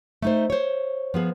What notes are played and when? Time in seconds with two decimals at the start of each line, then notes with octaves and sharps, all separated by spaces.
0.22 A3 D#4 C5
0.50 C5 C#5
1.14 F3 B3 G#4